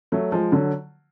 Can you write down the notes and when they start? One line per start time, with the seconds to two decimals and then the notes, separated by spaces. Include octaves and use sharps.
0.12 F#3 A3
0.32 F3 G#3
0.52 D3 F#3